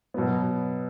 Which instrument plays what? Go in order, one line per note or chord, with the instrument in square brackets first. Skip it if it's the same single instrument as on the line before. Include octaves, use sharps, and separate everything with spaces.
[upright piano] B2 F#3 B3